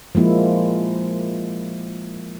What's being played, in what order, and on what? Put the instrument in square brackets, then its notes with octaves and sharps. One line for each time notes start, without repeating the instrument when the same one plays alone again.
[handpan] F3 G#3 A#3 E4